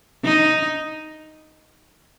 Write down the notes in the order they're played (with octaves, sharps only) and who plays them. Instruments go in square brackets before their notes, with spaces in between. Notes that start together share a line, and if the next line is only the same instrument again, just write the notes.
[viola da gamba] D#4